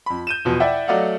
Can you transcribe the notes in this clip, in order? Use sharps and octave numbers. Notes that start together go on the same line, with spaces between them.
F2 B5
G6 D#7 E7
E2 B2 F3
E4 D5 E5 F#5 G5
F#3 A3 D5 D#5 F5 F#5